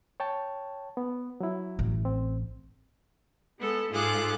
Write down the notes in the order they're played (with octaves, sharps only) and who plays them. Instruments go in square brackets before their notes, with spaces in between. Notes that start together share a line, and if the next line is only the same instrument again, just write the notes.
[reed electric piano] C#5 G5 A5
B3
F#3 E4
[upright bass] A1
[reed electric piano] C4
[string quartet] G#3 B3 A4
G#2 F4 G#4 A4 D6 F#6